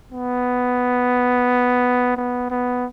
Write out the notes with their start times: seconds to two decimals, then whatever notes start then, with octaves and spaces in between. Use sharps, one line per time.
0.12 B3
2.17 B3
2.51 B3